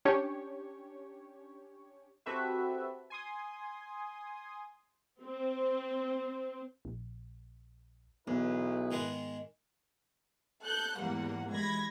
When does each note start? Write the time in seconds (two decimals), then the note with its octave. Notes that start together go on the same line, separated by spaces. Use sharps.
0.05 C#4 D4 G4 C#5
2.26 C4 F#4 G4 A4 B4 E5
3.10 G#5 C6 D#6
5.24 C4
6.85 A#1
8.28 B1 E2 B3 E4 G#4 B4
8.91 G#2 D#3 G#3
10.64 A4 F#6 G6
10.99 E2 G#2 G3 A#3 F#5
11.53 E3 G#3 B5 G#6 A#6